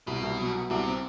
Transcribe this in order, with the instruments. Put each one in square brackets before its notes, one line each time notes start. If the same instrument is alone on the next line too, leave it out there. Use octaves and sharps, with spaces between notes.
[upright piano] C2 [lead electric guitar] B2
[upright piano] C2
F#3
B2
[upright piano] C2 [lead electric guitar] C3
[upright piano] C4